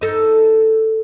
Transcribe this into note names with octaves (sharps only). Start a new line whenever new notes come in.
D#4 A4